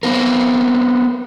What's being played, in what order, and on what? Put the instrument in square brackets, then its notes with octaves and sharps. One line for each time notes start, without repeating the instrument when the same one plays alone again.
[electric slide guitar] B3 C4 A#4